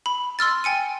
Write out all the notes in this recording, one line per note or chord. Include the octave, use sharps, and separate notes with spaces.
B5
C6 E6 F6 A6
G5 G#5 C#7 D#7